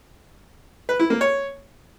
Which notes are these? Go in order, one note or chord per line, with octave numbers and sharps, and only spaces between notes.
B4
E4
A#3
C#5